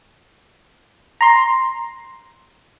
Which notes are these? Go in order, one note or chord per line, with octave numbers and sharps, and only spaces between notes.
A#5 C6